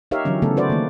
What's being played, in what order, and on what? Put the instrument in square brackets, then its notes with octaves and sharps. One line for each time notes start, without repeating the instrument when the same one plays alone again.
[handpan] D#4 G4 A#4 C#5 E5 F5
D3 E3 F#3 C#4
C#3 E3 A3 B3 A4
F#4 B4 C5 D5
D#3 A#3